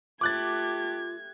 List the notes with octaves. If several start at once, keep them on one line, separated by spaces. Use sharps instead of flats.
A3 F4 G4 D6 F#6 G#6 A6